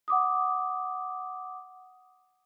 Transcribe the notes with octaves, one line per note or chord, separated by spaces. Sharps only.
F#5 D6 D#6